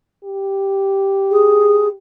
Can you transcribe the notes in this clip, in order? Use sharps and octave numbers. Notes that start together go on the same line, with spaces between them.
G4
G#4